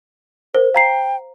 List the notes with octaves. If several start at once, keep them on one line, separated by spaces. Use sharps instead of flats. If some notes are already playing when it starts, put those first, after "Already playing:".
A#4 C5
F5 G5 A#5 C7